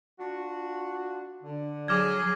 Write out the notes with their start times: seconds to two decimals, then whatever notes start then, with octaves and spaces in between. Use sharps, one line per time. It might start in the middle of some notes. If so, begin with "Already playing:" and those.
0.20 D4 F4 F#4
1.43 D3
1.88 F#3 G#4 D6 F6 G#6